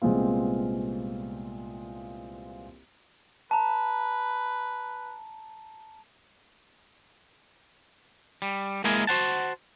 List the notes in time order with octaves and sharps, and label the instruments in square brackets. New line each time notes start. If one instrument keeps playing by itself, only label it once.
[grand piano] C2 A#2 G#3 B3 C4 F4
[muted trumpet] B4 [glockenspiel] A5 A#5
[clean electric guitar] G3
G#3 A#3 E4 G#4 A#4 G#5
F#4 C5 F#5 A5